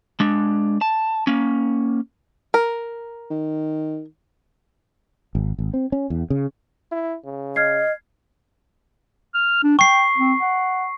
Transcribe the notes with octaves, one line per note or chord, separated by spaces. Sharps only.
G#3 D4
A5
A#3 C#4
A#4
D#3
G#1
G#1
C4
C#4
E2
C#3
E4
C#3
D#5 F6 G#6 C7
F6
D4
G5 C#6 C7
C4
F#5